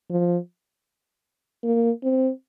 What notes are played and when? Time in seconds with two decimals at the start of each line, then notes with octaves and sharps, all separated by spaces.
0.10 F3
1.64 A#3
2.03 C4